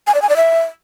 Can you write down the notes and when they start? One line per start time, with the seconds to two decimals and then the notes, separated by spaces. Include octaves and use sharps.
0.07 G#5
0.15 D5
0.22 G#5
0.29 D5
0.37 E5